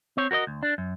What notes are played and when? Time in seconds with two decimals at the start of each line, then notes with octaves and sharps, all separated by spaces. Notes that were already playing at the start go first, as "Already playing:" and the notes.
0.17 C4 C#5
0.31 F#4 A#4 C#5 D#5
0.47 D2
0.63 D4
0.78 F#2